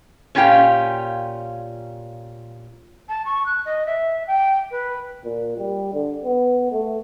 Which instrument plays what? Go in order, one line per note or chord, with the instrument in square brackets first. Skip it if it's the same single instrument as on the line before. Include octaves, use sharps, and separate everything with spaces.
[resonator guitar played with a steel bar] A#2 C#4 F4 G4 G5
[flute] A5
C#6
F#6
D#5
E5
G5
B4
[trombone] A#2
G3
D3
B3
A3